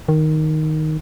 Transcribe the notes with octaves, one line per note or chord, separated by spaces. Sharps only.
D#3